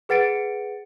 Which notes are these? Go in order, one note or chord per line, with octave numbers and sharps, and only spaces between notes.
G#4 B4 F#5 A6 C#7 D7